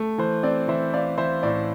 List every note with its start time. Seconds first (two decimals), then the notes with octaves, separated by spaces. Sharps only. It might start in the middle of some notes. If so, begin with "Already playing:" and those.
Already playing: A3
0.18 E3 C5
0.43 C4 D5
0.68 E3 C5 E5
0.94 C4 D5 F5
1.18 E3 C5 E5
1.43 A2 D5